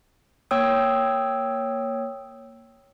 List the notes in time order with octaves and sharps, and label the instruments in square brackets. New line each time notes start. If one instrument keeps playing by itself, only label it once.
[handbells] A#3 C#5 G5 D#6 E6